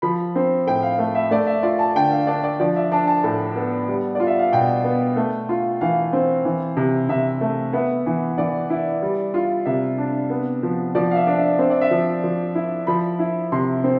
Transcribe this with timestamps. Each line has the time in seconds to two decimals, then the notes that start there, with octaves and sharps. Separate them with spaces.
0.02 F3 B5
0.35 C4
0.67 A2 G5
0.82 F5
0.99 A3
1.15 E5
1.31 A3 D5
1.47 E5
1.63 F4 D5
1.79 A5
1.95 D3 G5
2.11 F5
2.27 D4 D5
2.44 D5
2.60 F3 D5
2.76 E5
2.92 D4 A5
3.07 A5
3.24 A2 A5
3.56 B3
3.88 G3
4.15 F4 D5
4.27 E5
4.39 F5
4.52 B2 G5
4.84 B3
5.16 A3
5.49 F4
5.81 E3 F5
6.13 C4
6.45 E3
6.77 C3
7.09 C3 E5
7.41 A3
7.73 B3 E5
8.06 E3
8.38 E3 D5
8.70 E4
9.02 G3
9.34 F4
9.66 C3 E5
9.98 D4
10.30 B3
10.63 F3
10.95 F3 D5
11.11 F5
11.16 E5
11.27 D4
11.38 E5
11.59 C4 E5
11.70 D5
11.81 E5
11.91 F3
12.24 F3
12.55 E4
12.87 F3 B5
13.19 E4
13.52 C3 C6
13.84 C4